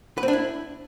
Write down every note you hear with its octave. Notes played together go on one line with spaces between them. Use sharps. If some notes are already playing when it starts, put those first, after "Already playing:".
B4
C4
D4
E4